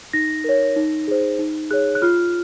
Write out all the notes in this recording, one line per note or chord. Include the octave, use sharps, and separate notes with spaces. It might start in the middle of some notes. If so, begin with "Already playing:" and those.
D#4 A#6
A#4 C#5
D#4
G#4 C5
D#4
G#4 C#5 F#6
F#6
F4 F6